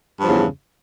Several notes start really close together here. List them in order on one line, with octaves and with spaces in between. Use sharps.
G2 F3 C#3 E2